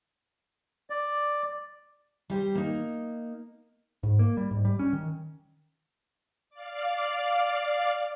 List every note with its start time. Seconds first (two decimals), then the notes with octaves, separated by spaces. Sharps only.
0.90 D5
2.30 G3 G4 C5
2.55 A#3 D#4
4.03 G#2
4.19 A#3
4.37 G3
4.51 G#2
4.65 G3
4.79 C#4
4.93 D#3
6.50 D5 F5